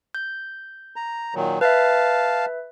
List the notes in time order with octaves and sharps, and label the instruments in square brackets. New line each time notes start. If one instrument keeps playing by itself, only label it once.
[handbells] G6
[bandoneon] A#5
A#2 D#3 F#3
[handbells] B4 E5 [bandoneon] F5 A5